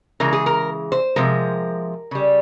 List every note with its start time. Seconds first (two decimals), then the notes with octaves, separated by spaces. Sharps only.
0.20 C#3 E3 G#3 A#4
0.33 G#4
0.46 A#4
0.92 C5
1.16 C3 F3 G#3 A#4
2.11 C#3 G3